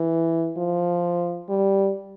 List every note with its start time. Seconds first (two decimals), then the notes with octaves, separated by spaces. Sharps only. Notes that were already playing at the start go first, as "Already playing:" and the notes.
Already playing: E3
0.58 F3
1.49 G3